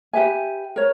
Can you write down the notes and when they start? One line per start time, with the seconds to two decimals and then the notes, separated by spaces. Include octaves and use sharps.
0.13 G4 B4 E5 G#5
0.76 A#4 C#5